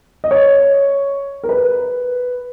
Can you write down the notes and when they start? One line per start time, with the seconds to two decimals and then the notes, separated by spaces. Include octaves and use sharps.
0.24 D#5
0.31 C#5
1.43 A#4
1.49 B4